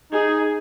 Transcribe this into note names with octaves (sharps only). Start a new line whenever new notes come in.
D#4 G#4